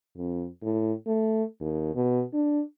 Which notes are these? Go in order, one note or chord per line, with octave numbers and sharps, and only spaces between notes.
F2
A2
A3
D#2
B2
D4